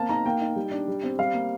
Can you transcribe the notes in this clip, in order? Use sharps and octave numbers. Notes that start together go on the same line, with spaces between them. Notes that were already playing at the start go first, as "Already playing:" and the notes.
Already playing: A#3 C4 A5
D#4 A#5
A#3 G5
D#4
G3
D4
G3
C4
G3 F5
A#3